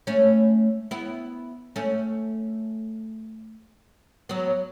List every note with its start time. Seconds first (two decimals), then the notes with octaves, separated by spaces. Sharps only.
0.07 A3 C#4
0.91 B3 E4
1.76 A3 C#4
4.29 F#3 B3